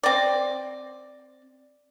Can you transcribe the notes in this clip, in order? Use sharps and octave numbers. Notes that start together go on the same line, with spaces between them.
C4 D5